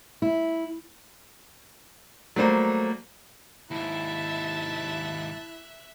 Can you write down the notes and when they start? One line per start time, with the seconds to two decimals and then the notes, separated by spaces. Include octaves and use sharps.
0.22 E4
2.36 F#3 G3 A3 A#3 C5
3.71 D#2 G#2 E4 E5 A5 F#6